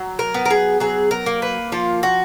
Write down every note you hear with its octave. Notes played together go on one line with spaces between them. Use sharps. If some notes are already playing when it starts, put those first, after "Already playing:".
Already playing: F#3
A#4
B3
A#4
G#4
F#3 G#4
A#4
A#3
B4
F3 F4
F#4